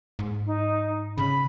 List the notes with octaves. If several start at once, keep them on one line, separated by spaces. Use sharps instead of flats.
G#2
D#4
C#3 B5